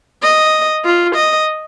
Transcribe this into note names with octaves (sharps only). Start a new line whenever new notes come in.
D#5
F4
D#5